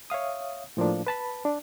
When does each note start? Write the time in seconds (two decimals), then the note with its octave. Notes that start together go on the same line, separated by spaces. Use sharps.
0.10 C#5 E5 F5 D#6
0.77 A2 F3 A#3 D4
1.07 B4 A5 B5
1.45 D4